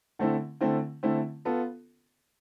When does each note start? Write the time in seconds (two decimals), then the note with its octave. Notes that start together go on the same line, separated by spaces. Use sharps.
0.19 D3 A3 C4 E4
0.61 D3 A3 C4 E4
1.03 D3 A3 C4 E4
1.45 B3 F4 A4